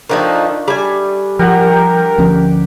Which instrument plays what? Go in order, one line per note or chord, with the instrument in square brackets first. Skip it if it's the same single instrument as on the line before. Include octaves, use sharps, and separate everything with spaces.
[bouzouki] D#3 F3 D#4 [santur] A3 D4
[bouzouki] G3 G#5
[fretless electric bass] F3 [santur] G4 F#5 [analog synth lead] A#4
[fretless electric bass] D2 F3 C#4